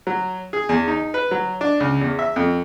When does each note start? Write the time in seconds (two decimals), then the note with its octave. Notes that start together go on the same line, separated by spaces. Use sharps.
0.07 F#3
0.53 G#4
0.69 E2
0.88 D#4
1.14 B4
1.31 F#3
1.61 D4
1.80 C#2
2.01 E2
2.19 E5
2.36 F2